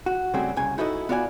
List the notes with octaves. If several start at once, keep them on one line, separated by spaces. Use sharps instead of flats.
F#4
C#3 G3 A3 C4 F#4 G#4
C2 C#3 G#5
D#4 E4 F#4 A4 C#5 D#5
B3 F4 F#4 D5 E5 G#5